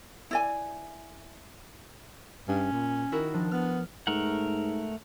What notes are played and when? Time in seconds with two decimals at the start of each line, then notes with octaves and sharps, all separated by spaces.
0.31 E4 D5 G#5
2.48 G2 C#4
2.72 A#2
3.12 D#3 E4 F#4 A#4
3.34 F3 D4
3.52 B3 F6
4.07 G#2 A3 A#4 F#5